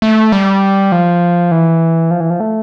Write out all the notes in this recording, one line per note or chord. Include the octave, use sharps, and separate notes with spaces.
A3
G3
F3
E3
F3
E3
F3
A3